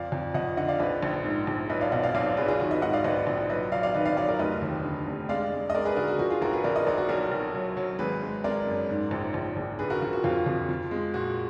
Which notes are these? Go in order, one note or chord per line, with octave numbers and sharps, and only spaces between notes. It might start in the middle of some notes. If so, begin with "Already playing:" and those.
Already playing: F2 D5 F5
F2
F2 D#5 F#5
D3 D#5 F#5
D5 F5
A#1 B4 D#5
A#1
G#2
A#1
B1 B4 D#5
D5 F5
B2 D#5 F#5
D5 F5
B1 D5 F5
B1 G#4 B4
F4 G#4
D#3 F#4
B4 D#5
G#2 D#5 F#5
D5 F5
A#1 B4 D#5
A#1
F#3 B4 D#5
F#3 D5 F5
D5 F5
D#3 B4 D#5
D5 F5
F#3 D5 F5
A#4 D5
F1 B4 D#5
D#2
D3
F1
G#3 D5 F5
G#3
D#5
G#3 A#4 D5
G#4 B4
D3 F#4 A#4
F#4
F3 F#4
F4 G#4
A#1 F#4 A#4
G#4 B4
F3 A#4 D5
B4 D#5
A#1 A#4 D5
F#4
B1 F#4 A#4
B1
F#3
F#3
G#1 G#4 B4
G#3
G#3 A#4 D5
F#2
G#2
A#1
A#1
A#1
D3 G#4 B4
F#4 A#4
F3 F#4
F#4
F2 F4
F2
F3
G#3
A#2 F#4